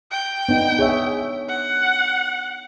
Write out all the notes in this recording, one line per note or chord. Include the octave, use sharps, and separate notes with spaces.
G5
B3 D4 D#4
G#4 C#5 E5
F#5